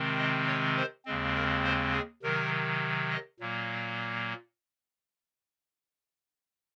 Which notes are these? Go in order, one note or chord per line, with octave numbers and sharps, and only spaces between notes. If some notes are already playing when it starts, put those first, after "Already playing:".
Already playing: C3 D#3 G#3 C4
D#5
C#5
C5
D#2 C#3 G#3 C4
A#4
C5
G#4
C3 D#3 F#3 A#4
D#5
A#2 F#3 A#3